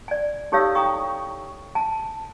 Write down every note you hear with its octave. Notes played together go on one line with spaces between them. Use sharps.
D5 G#5
D#4 G4 A4 C#5 F5 E6
E4 A4 G5 A#5 C#6 D#6
G#5 A5